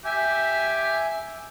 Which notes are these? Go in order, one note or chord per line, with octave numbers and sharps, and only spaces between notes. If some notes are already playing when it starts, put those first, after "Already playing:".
G4 E5 G#5